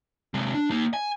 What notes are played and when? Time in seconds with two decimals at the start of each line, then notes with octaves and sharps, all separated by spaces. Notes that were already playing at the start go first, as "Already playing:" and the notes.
0.34 C3 G#3
0.54 D4
0.71 A#3 D#4
0.94 G#5